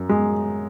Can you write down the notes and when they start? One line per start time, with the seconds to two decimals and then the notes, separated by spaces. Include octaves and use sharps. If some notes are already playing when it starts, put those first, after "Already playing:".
Already playing: F#2
0.09 G#3